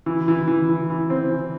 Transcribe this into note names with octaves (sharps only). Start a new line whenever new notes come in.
E3
E3
E3
E3
E3
C4
E3